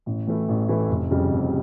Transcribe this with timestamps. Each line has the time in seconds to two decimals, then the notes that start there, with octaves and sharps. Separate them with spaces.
0.06 A1
0.27 A2 E3 A3 E4
0.49 A1
0.68 A2 E3 A3 E4
0.89 F1
1.11 F2 C#3 G3
1.31 F1